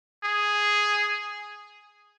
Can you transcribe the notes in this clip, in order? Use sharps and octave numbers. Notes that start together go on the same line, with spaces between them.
G#4